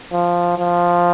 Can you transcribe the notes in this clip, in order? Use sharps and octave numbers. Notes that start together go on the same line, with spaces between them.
F3
F3